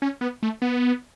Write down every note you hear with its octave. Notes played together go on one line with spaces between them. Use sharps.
C#4
B3
A3
B3